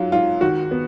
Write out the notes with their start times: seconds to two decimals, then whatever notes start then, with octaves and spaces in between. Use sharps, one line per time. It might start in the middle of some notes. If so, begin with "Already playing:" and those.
Already playing: G#2 F#3 F4
0.12 G#2 F4
0.41 D#3 F#4
0.71 B3